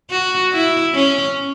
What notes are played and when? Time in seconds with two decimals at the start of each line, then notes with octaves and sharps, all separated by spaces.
0.10 F#4
0.53 E4
0.94 C#4